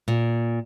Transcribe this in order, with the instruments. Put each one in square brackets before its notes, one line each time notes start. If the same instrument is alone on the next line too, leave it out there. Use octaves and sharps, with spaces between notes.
[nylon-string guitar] A#2